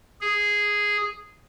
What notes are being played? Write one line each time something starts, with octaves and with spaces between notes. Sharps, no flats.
G#4